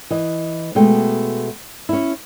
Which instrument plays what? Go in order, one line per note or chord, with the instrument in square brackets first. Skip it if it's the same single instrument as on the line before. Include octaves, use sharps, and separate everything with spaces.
[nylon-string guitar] E3 D#5
B2 G#3 A3 G5
C#4 E4